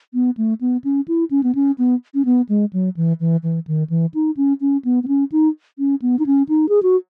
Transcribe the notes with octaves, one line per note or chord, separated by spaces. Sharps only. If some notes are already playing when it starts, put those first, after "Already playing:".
B3
A3
B3
C#4
E4
C#4
B3
C#4
B3
C#4
B3
G#3
F#3
E3
E3
E3
D#3
E3
D#4
C#4
C#4
B3
B3
C#4
D#4
C#4
B3
D#4
C#4
D#4
G#4
F#4